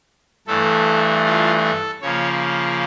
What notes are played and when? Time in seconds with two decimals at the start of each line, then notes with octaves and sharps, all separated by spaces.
0.47 G2 E3 A3 A4
1.26 F4
1.64 A4
2.02 C#3 F3 A#3 C#5